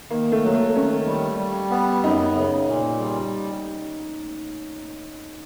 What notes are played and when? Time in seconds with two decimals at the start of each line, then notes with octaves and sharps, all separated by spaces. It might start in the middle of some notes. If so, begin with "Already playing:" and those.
0.10 D#3 A#3
0.32 A3
0.43 F#3
0.54 A3
0.75 D#3 C#4
1.07 G3
1.39 G3
1.71 B3
2.03 F#2 D#4
2.35 C#3
2.68 A#2
2.99 G3